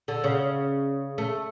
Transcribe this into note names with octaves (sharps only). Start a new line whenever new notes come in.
D3
C#3
A3